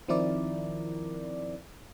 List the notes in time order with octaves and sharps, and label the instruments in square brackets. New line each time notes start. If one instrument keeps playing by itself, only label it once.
[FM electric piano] D#3 F3 C4 E4 A#4 D5